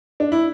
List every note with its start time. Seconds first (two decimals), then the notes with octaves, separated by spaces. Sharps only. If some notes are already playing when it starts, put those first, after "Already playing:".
0.20 D4
0.32 E4